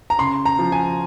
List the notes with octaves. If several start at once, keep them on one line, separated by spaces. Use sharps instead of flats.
A#5
C#3 C6
A#5
F3
G#5